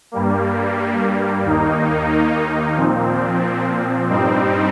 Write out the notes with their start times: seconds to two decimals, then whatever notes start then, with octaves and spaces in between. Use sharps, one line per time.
0.12 G2 G3 A#3
1.44 D#2 D#3 A#3 D#4
2.76 A#2 F3 C4
4.09 G2 G3 C4 D#4